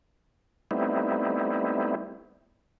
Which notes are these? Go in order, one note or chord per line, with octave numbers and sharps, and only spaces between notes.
G3 A3 B3 C4 D#4 E4